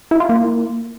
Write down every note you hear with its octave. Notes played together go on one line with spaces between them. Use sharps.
E4
F4
A#3